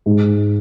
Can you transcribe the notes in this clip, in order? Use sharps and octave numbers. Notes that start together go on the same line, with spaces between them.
G#2